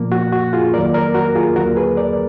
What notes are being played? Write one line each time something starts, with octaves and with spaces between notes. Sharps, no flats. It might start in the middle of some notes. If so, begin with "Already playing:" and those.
Already playing: A#2 F3 A#3
F#4
F#4
F4 G#4
F2 D#3 F#3 A#3 A#4 D5
A#4 D5
F#4 A#4
F4 G#4
D#2 D3 F#3 A#3 F#4 A#4
G#4 B4
A#4 D5